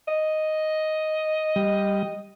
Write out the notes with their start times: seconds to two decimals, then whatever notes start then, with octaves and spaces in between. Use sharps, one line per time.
0.08 D#5
1.56 G3